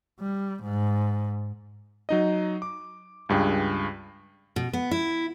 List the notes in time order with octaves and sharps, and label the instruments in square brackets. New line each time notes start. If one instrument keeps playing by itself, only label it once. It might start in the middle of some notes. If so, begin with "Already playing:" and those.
[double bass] G3
G#2
[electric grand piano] F#3 D#4 D#5
D6
C#2 G2 G#4 G5
[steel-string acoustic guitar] B2
B3
E4